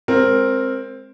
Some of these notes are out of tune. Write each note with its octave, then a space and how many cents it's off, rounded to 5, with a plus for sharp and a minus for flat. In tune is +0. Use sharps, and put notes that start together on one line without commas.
G#3 +0 C4 +15 A#4 +0